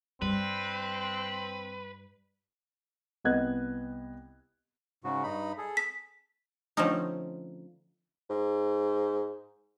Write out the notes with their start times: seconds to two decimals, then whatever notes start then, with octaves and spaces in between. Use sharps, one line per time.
0.22 G2 G3 C4 B4
3.24 C2 B3 D#5 F#6 G#6
5.04 G#2 C#3 F#4
5.23 G2 D#4 B5
5.58 G#4 A4
5.77 B6
6.77 D3 F3 A3 C4 C#4 D#4
8.30 G#2